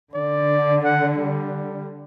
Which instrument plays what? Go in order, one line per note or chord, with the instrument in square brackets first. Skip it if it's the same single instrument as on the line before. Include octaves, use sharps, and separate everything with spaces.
[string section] D3 [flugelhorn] D5
[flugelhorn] F#5
G3